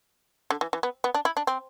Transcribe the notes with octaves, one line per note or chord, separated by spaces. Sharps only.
D3
E3
E3
B3
B3
D4
E4
D4
C4